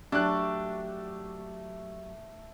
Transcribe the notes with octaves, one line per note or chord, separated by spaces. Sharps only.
F#3 A3 D4 G4 F#6